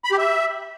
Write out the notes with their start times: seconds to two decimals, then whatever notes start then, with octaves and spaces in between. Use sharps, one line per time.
0.04 B5
0.11 G4
0.18 E5